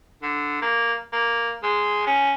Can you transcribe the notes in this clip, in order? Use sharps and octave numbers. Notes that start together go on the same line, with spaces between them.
D3
A#3
A#3
G#3
C#4